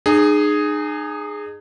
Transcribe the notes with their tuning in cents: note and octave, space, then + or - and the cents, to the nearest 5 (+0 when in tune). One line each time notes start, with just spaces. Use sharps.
D#4 -40 G#4 +0